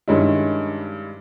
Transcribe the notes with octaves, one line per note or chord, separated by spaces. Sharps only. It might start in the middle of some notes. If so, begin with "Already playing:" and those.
G2 D#3 G#3 C#4 E4